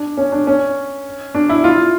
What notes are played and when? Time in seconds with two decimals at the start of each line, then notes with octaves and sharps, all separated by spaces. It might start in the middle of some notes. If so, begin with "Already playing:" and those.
Already playing: D4
0.17 C#4
0.32 D4
0.47 C#4
1.35 D4
1.49 E4
1.64 F4